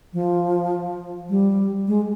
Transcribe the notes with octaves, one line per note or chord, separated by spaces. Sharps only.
F3
G3
G#3